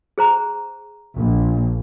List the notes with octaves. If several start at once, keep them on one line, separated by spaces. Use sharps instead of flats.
G#4 C5 A#5
A#1